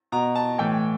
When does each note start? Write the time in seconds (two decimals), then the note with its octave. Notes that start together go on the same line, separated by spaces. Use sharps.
0.12 B2 A#5
0.35 A5
0.58 A2 E3 G5